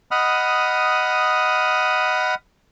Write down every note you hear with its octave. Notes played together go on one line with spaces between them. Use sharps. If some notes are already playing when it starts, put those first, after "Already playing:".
D#5 F#5 B5 D#6 F6